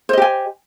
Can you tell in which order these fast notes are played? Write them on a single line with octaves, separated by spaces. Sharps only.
C5 D#5 G4 G#5